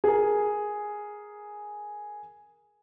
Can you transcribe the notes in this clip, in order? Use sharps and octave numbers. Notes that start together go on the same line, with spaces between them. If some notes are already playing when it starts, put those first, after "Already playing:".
G#4 A#4